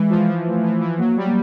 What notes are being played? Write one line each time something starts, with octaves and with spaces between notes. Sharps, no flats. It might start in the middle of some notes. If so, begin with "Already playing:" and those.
Already playing: E3 G#3
F3
F3
A3
E3
E3
F#3 A#3
G3
A#3